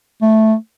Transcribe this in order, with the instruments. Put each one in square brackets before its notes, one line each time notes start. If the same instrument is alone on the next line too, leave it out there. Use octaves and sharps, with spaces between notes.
[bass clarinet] A3